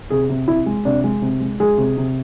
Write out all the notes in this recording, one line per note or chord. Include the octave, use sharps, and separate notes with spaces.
C3 G#4
C3
C3 E4
G#3
C3 D4
G#3
C3
G#3
G#3 G#4
C3
C3